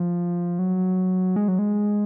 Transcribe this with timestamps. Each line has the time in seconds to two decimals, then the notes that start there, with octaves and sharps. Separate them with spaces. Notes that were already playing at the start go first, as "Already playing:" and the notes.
Already playing: F3
0.59 F#3
1.36 G#3
1.48 F#3
1.59 G#3